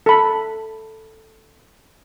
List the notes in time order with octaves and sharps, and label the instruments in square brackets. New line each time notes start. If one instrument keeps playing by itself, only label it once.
[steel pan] A4 B5